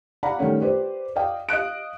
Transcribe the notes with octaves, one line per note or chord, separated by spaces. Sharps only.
D5 F5 F#5 A#5 B5
D#3 G3 A3 C#4
G4 B4 C5 D5
D5 D#5 F5 G5
D#5 F5 F#6 D7